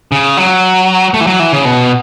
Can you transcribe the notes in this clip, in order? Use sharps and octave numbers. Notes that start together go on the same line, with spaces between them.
C#3
F#3
A3
E3
F#3
E3
C#3
B2